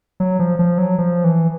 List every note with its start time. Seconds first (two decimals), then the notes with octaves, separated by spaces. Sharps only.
0.20 F#3
0.39 F3
0.59 F3
0.78 F#3
0.98 F3
1.24 E3